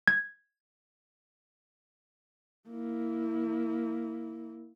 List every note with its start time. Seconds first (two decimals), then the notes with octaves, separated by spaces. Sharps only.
0.08 G#6
2.69 A#3 E4